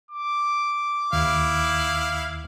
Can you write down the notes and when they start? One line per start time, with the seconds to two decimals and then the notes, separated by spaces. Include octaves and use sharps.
0.11 D6
1.13 D#2 E4 F5